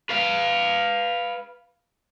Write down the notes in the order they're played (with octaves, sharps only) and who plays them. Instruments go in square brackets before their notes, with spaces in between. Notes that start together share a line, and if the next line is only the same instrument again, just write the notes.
[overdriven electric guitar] B4 F5